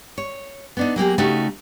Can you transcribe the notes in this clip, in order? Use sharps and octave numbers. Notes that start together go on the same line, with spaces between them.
C#5
B3 D4 D#4
F#3 A#3 G4 G#4
C#3 A3 D#4 F#4 G4